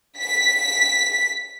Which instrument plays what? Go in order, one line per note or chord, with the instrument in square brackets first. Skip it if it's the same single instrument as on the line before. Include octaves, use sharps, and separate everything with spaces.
[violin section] B6